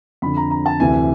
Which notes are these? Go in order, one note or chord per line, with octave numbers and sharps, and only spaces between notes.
F2 D3 B5
A#5
A#5
A5
D2 C3 E3 G#5